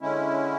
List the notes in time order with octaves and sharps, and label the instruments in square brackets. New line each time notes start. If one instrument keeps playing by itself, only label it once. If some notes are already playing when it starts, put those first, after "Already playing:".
[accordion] D3 G#3 C#4 E4